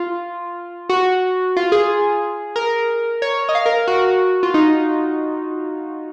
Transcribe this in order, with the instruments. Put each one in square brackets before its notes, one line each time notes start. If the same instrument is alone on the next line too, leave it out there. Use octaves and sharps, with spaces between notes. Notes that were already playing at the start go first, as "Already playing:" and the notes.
Already playing: [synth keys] F4
F#4
F4
G#4
A#4
C#5
D#5
F5
A#4
F#4
F4
D#4